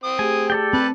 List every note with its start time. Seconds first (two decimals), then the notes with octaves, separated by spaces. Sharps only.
0.04 C4 D#6
0.19 A3 G4 G#4 G#5
0.50 A4 D5 G5
0.73 C4 B4 A5